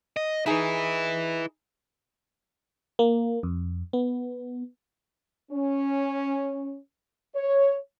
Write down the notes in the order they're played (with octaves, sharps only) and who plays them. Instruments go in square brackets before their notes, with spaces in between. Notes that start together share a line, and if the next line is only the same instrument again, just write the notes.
[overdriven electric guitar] D#5
[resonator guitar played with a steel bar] D#4 G#4 [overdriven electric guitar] E4 B4
[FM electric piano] A#3
F2
B3
[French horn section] C#4
C#5